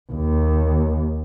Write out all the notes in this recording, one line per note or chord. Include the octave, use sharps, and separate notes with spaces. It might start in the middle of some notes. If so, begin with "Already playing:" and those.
D#2